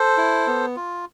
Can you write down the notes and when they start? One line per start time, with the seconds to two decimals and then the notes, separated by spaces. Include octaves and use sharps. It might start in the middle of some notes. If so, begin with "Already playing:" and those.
Already playing: A4 C5
0.17 E4
0.47 B3
0.76 F4